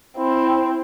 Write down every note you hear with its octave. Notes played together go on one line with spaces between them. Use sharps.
C4 E4